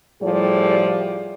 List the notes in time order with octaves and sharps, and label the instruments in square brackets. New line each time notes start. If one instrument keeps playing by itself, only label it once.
[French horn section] A2 F3 G3 G#4 D5